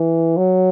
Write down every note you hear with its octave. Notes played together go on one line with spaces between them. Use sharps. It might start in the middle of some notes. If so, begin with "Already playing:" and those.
Already playing: E3
F#3